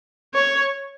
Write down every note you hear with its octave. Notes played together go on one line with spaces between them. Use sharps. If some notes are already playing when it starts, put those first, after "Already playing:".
C#5